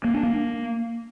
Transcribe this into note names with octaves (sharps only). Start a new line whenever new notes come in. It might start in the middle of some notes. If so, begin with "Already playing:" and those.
A#3
D4
A#3